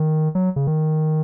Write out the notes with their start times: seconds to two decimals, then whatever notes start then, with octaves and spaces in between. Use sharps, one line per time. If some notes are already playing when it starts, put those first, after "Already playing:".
Already playing: D#3
0.35 F#3
0.56 C#3
0.67 D#3